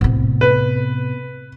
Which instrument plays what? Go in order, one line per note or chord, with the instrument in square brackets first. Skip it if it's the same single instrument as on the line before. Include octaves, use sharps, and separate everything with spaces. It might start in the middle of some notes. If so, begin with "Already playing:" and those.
[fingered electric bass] A2 C3 [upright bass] B3 C4
[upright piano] B4